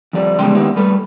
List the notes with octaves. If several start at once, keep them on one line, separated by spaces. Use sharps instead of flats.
F2 F3 G3 D5
E2 C#3 G3 G#3 G5 C6
D#3 A#3 B3 E4 G4
G3 A3 A4 B4